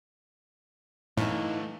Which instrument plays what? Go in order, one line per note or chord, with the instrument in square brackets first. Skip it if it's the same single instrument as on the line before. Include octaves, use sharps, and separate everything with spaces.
[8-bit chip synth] A2 [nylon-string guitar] E3 D#4 [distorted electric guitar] A3 F5